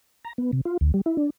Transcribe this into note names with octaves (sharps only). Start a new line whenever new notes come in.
A#5
B3
C3
F4
D2
G3
E4
D4